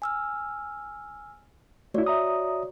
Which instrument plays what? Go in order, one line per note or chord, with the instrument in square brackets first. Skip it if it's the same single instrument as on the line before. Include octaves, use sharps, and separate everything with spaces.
[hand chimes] G#5 E6 F6
[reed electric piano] A3 E4 [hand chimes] F#4 C#5 D5
[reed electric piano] E5 A#5 D#6